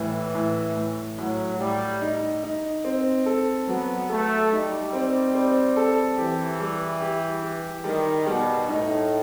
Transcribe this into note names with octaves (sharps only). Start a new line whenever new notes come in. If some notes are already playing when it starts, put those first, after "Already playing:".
Already playing: A2 E3 G3
A2
A2
A2 F#3
A2 G3
D#4
D#4
C4
A4
F#3 B3
A3 A4
G3 D#4
C4
C4
A4
E3 G4
G3
G4
G4
D#3 G3
B2 G3
A2 D#4